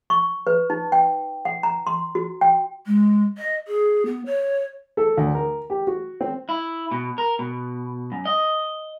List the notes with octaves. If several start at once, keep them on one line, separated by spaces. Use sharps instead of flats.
C#6
B4
D#4
G5
F#5
A#5
C6
F#4
G5
G#3
D#5
G#4
B3
C#5
A4
D2
A#4
G4
F#4
C4
E4
B2
A#4
B2
F#2
D#5